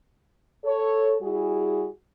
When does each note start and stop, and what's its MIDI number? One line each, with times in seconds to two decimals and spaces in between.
0.65 1.17 69
0.65 1.17 73
1.22 1.88 55
1.22 1.88 64
1.22 1.88 66
1.22 1.88 68